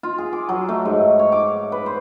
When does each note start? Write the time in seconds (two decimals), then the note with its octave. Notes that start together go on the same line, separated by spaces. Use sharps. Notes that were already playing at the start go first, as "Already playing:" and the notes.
0.03 F4
0.18 G#4
0.33 D6
0.49 F#3
0.69 A3
0.85 G#2
1.19 C#5
1.32 D6
1.72 B4
1.86 C5